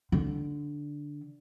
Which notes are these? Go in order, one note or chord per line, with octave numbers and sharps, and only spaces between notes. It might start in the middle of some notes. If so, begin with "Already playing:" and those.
D3